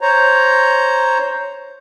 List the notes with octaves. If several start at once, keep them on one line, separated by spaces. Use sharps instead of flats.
C5 C#5 A#5